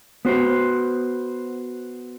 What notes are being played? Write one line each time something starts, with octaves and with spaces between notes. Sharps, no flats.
B3 F#4 C5